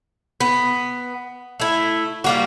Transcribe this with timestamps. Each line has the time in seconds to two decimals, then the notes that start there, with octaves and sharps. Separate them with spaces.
0.40 B3
1.60 A3 E4
2.24 G3 A#3 F#4